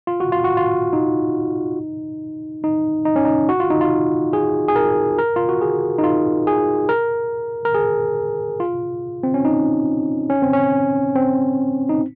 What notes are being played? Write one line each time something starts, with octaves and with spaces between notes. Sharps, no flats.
F4
F#4
F4
F#4
F4
D#4
D#4
D#4
C#4
D#4
F#4
F4
D#4
F4
G#4
G#4
A#4
A#4
F4
F#4
G#4
D#4
F4
G#4
A#4
A#4
G#4
F4
C4
C#4
D#4
C#4
C4
C#4
C4
D#4